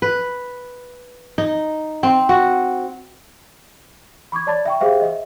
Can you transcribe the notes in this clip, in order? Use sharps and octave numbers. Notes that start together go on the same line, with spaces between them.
B4
D#4
C4
F#4
B5 C#6 D6 G#6
C#5 D5 A5 B5 A6
E5 G5 C#6
G4 G#4 C5 E5 F5 G5
D#5 E5